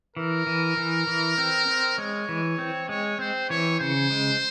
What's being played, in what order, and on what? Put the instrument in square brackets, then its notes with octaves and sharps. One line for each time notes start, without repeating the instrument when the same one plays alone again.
[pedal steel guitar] E3 [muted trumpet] A#4
[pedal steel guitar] E3
E3
E3
C4
C4
[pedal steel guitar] G#3 [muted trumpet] C#5
[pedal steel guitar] E3
C4
[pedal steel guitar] G#3 [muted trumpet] C#5
[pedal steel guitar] C4 [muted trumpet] C5
[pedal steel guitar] E3 [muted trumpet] C#5
[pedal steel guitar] C#3 [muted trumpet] C5
[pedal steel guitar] G#3